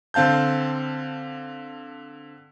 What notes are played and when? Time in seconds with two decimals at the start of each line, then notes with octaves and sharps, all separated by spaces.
0.14 D3 C4 F5 A5 G6